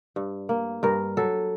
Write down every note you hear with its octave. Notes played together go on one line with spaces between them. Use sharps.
G2
A#3
G2 A#4
F#3 A4